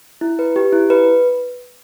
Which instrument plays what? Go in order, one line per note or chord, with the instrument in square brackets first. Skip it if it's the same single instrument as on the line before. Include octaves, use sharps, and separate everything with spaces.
[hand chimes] E4
B4
G4
E4
B4